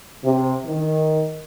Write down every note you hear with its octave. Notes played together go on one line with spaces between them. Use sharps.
C3
D#3